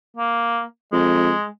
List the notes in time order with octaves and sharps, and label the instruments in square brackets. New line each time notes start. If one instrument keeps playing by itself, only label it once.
[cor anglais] A#3
[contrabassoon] F2 [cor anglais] G#3